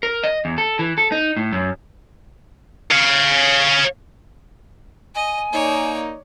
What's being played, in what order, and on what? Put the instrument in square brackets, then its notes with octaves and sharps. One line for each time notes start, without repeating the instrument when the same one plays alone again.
[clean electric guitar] A#4
D#5
E2
A4
E3
A4
D#4
A2
F#2
[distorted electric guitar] C#5 F5
[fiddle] D#5 [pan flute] G#5
[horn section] A#3 D#4 [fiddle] C#5 D5